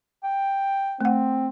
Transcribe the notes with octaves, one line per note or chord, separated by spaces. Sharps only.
G5
A3 C4 F#5